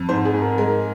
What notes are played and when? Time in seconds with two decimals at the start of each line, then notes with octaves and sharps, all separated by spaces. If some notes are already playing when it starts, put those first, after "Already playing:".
Already playing: F2
0.09 G#2 C5
0.25 G#4
0.33 G#2
0.42 A#4
0.58 G#3 A#4